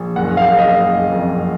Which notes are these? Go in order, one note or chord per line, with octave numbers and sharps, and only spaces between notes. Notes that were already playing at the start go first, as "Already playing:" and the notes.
Already playing: A#1
F#1 F#5
F5
F#1
D#5
F#1
F2